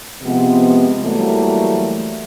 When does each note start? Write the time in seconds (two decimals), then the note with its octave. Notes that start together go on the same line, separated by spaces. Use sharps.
0.22 C3 F3 G#3 B3
1.02 E3 F#3 G3 A3 A#3